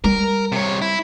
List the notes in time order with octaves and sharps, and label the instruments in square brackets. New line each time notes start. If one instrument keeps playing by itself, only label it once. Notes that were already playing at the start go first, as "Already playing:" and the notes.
[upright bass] G3 [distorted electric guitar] A#4
[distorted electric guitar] C3 C#5
E4